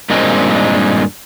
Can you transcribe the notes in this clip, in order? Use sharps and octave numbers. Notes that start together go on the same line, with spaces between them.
G2 A#2 D#3 G#3 C4